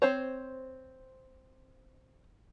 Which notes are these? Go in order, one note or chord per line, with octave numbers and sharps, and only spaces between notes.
C4 C5 C#5